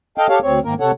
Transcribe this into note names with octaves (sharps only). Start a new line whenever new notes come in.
A4 D#5 F5 G5
G4 A4 C#5 F5
D2 C4 C#5
G#2 D#3 A#3 A#4
C3 A4 C#5 F#5